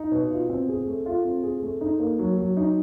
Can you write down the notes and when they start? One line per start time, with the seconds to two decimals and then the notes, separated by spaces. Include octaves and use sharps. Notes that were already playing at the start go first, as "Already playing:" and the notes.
Already playing: D#4
0.12 B2
0.31 F4
0.50 C4
0.69 G#4
0.87 A3
1.06 F4
1.25 C4
1.43 G#4
1.63 A3
1.81 D#4
2.00 A#3
2.19 F#3
2.38 F#3
2.57 D#4